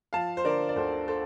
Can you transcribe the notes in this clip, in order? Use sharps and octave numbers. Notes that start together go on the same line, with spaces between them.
F3 F5 A5
C5
D3 A#4 D5
D5
D2 A4 C5
A4 C5